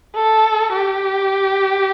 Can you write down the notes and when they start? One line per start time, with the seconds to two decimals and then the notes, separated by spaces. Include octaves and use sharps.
0.15 A4
0.73 G4